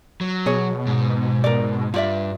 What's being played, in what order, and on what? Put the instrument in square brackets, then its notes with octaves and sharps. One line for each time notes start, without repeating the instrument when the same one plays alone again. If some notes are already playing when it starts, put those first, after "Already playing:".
[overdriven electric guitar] F#3
[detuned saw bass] B2 [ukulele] G#4 C#5
[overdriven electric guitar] G#2
[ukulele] A#4 D5
[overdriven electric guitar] G2 [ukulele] F4 D5 E5